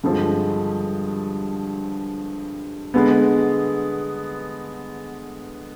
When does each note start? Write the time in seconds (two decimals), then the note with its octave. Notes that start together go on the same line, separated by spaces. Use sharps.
0.04 G2 D3 F3 G#3
2.94 D3 G#3 B3